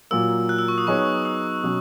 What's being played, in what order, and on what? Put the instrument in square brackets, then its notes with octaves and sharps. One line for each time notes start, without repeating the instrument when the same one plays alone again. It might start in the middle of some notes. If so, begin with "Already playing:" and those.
[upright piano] A#2 F#3 A#3 [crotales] E6
[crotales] F#6
E6
C#6
D#6
[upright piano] F#3 B3 D#4 G#4 C#5 [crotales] C#6
[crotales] D#6
[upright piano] B2 F#3 C#4